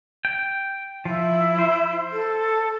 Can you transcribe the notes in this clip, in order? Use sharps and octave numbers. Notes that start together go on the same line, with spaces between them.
G5
F3 E4
C5
A4